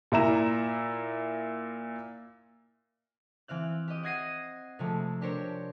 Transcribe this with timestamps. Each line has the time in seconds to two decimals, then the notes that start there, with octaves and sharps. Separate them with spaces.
0.12 A#2 E4 A#5 E7
3.48 E3 C4 F5 F#6
3.88 G4 D#5
4.03 F#5 D#6 G#6 A#6 C7 D#7
4.79 C3 F3 G#3 A3 C4
5.21 D4 G4 A#4 C5 C#5